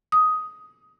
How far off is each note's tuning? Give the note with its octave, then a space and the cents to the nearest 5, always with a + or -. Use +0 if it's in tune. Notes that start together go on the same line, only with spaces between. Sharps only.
D#6 +10